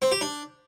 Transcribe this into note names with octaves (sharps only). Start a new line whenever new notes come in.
C4
G4
D4